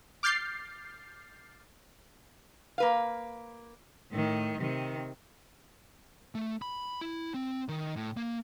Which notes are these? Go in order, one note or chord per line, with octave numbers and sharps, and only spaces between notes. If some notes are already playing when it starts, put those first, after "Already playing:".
D6 F6 G6 A6 C7
A#3 B4 F5
A2 D#3
C3 D#3
A3
B5
E4
C4
D#3
A2
A#3